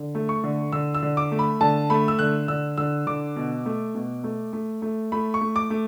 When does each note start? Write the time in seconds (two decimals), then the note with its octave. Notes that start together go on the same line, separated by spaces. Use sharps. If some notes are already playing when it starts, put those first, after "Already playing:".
Already playing: D3
0.15 A3
0.29 C#6
0.44 D3
0.72 D3 E6
0.94 E6
1.03 D3
1.17 D6
1.32 A3
1.39 B5
1.61 D3 A5
1.90 A3 B5
2.08 E6
2.19 D3 F#6
2.48 D3 E6
2.77 D3 E6
3.07 D3 D6
3.36 B2
3.66 A3
3.95 B2
4.24 A3
4.53 A3
4.82 A3
5.12 A3 B5
5.34 C#6
5.41 A3
5.56 D6
5.70 A3